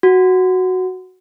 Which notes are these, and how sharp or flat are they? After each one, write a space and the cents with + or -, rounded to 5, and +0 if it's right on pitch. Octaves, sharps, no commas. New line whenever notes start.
F#4 +0